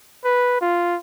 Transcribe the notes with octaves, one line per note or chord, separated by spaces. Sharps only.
B4
F4